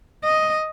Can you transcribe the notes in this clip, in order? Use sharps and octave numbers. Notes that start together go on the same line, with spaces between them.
D#5